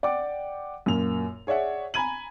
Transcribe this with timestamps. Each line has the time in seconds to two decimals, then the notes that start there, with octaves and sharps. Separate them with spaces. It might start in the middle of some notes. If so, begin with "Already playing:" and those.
0.03 D5 F#5 G5 D6
0.86 F#2 A#2 A#3 F7
1.47 G#4 C#5 D5 E5 F#5
1.94 G#5 A#5 B5 G#6 D#7 F#7